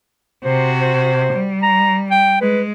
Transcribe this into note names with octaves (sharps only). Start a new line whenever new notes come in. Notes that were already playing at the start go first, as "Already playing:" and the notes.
C3 F#4 C5
C5
G3
A#5
G5
G#3 B4